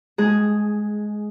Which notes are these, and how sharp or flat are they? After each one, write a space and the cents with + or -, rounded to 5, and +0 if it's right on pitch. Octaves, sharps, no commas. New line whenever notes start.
G#3 +15 G#4 +0 A5 +0